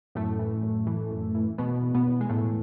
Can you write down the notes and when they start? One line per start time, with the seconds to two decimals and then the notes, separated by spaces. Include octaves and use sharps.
0.15 F#2 A2 A3
0.39 E3
0.63 F#2
0.87 E3
1.11 F#2
1.35 E3
1.58 E2 B2 B3
1.82 E2
1.95 B2 B3
2.07 E2
2.21 G#3
2.30 A2 E3 A3